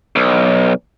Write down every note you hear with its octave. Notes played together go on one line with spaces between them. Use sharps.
B1